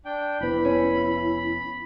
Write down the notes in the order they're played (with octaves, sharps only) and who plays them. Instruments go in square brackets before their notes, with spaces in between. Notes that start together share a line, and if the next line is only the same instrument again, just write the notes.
[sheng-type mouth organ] D4 G5
[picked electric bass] F1 B3 [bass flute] E4 [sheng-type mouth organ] B5
[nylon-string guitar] C#4